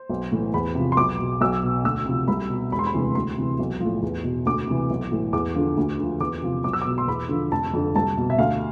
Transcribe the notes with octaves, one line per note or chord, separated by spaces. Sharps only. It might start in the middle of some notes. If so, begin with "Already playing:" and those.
Already playing: C5
B1
A2 E3
E2 B5
C3 F3
C6
B1 D6
B2
B1 E6
B2
D2 E6
C3 F3
C2 B5
B2
E1 B5
C6
B5
D2 C3 E3
D2 C6
C3 E3
B1
A2 F3
E2
B2
D2 D6
C3 E3
B1
A2 E3
E2 D6
D3 F3
D2
D3 F3
E2 D6
C3 F3
B1 D6
E6
D6
B2
C6
E2 B5
D3 F3
F1 A5
F2 D3
C2 A5
B2
E5
D2 F5